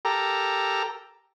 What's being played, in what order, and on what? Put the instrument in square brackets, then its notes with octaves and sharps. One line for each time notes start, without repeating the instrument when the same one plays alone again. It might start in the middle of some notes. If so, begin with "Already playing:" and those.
[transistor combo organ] G4 A4 A#4 A#5